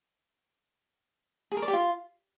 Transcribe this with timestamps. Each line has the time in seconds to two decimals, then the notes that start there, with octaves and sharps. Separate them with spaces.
1.52 G#4
1.57 A#4
1.62 D5
1.68 G4
1.73 F4